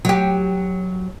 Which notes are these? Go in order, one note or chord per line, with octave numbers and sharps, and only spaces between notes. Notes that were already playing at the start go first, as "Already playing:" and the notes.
F#3 G4